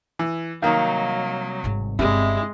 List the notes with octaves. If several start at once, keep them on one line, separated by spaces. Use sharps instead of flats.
E3
C2 D#3 F#3 A#3 D#4 F5
G#1 G#2
G1 C3 G#3 C4 D4 E4